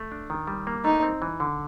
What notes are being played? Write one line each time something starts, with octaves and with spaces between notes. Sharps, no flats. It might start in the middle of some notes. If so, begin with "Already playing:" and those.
Already playing: A3
D4
D#3
G3
A#3
A3 D#4
C4
E3
D3